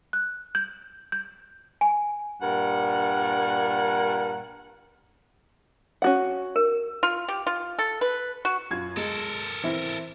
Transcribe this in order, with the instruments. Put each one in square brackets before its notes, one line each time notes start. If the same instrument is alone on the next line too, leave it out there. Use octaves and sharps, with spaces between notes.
[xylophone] F#6
G6
G6
G#5
[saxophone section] G2 A#2 A#4 F#5
[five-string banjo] C#4 F#4 F#5
[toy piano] A#4
[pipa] F4
G4
F4
A4
B4
F#4
[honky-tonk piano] F#2 F4 G#6
[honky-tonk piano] G#3 [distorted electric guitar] A4 A#4
[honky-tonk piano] E3 C4 E4